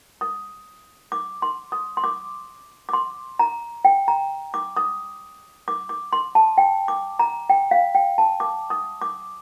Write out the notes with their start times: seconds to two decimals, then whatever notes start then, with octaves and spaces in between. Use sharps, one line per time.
0.21 D#6
1.12 D6
1.42 C6
1.72 D#6
1.97 C6
2.04 D6
2.89 D6
2.93 C6
3.39 A#5
3.85 G5
4.08 A#5
4.54 D6
4.77 D#6
5.68 D6
5.89 D6
6.13 C6
6.35 A5
6.58 G5
6.88 D6
7.19 A#5
7.50 G5
7.71 F5
7.95 G5
8.18 A5
8.40 D6
8.70 D#6
9.02 D6